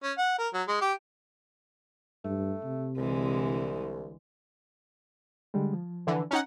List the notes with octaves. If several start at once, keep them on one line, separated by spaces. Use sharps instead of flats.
C#4
F#5
A#4
F#3
G#3
G4
G2 A3
C3
C2 D3 E3 G#3
D3 G3 G#3
F3
D3 E3
C#4 D#4 F#5